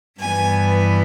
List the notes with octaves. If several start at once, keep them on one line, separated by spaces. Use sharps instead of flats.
G2 E3 G3 B3 G#5